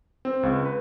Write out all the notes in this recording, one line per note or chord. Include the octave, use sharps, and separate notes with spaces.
C4
C#2
B4